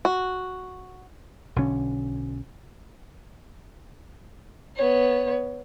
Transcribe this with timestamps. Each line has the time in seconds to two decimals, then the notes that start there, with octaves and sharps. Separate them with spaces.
0.05 F#4
1.56 B1 D3 C#4
4.77 B3 C#5